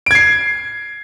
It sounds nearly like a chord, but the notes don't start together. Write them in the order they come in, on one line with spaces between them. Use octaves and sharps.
D7 G#6 C7